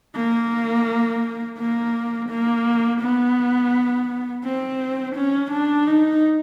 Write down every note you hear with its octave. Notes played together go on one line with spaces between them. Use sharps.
A#3
A#3
A#3
B3
C4
C#4
D4
D#4